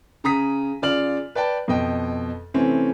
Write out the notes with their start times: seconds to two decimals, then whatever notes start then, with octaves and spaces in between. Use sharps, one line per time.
0.24 C#3 A#5 D#6 B6
0.82 C#3 F4 D5 F6 F#7
1.35 B4 D5 G5 A5
1.68 F2 B2 D#5 G5
2.54 C3 E3 A3 C4 C#4